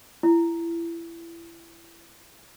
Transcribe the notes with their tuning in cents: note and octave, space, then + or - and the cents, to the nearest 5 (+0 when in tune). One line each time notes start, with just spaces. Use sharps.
E4 +25